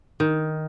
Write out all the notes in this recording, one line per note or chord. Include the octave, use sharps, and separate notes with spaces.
D#3